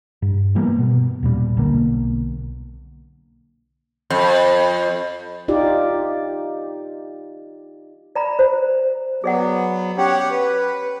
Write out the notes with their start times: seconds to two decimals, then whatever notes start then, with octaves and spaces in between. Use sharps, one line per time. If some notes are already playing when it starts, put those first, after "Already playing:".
0.22 G2
0.55 E3 G3 A#3 B3
0.78 B2
1.23 D#2 A#2 G3
1.57 B1 D3 A#3
4.10 F2
5.48 D#4 F4 G4 D5
8.15 D5 A#5 B5
8.39 C5
9.24 F#3 B3 G#4 D5 F#5
9.98 C#4 G4 C#5 F#5
10.31 B4